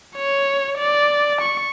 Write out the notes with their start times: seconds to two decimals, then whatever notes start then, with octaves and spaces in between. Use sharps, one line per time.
0.16 C#5
0.78 D5
1.41 C#6